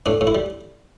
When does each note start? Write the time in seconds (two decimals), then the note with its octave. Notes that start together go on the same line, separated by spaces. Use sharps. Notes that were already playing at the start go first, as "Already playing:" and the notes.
0.06 A2 D4
0.21 A2
0.27 E4
0.35 G3